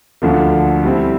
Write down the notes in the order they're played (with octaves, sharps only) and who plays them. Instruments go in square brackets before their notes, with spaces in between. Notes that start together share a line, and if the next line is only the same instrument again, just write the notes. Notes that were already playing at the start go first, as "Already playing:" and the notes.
[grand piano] D2 D3 F3 A#3
G3 C4 E4